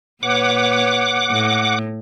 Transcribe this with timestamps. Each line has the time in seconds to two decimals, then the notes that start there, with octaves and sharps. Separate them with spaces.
0.23 A#2 B4 C#5 F#5 D6
1.30 A2